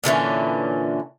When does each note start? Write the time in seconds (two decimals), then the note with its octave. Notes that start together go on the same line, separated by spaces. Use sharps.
0.04 A#2 D3 E3 C#4